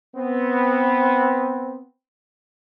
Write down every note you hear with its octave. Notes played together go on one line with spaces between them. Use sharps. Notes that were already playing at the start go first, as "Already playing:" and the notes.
B3 C4